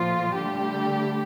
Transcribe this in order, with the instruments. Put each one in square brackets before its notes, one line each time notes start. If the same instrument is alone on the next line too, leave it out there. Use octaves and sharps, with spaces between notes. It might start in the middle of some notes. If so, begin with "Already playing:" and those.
Already playing: [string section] A#2 F3 A3 F4
D3 G3 A3 G4